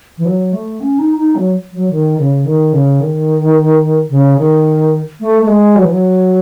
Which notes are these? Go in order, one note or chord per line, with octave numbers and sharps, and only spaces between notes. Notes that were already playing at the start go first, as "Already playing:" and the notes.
E3
F#3
A3
C#4
D#4
D#4
F#3
F#3
D#3
C#3
D#3
C#3
D#3
C#3
D#3
A3
A3
G#3
F#3
E3
F#3